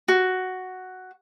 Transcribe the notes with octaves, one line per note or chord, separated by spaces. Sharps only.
F#4